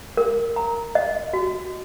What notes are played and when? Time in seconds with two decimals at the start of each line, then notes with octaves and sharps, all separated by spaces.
0.17 A#4
0.56 A#5
0.95 D#5
1.33 F#4